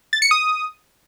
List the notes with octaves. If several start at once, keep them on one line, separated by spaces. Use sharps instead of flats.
A6
C#7
D#6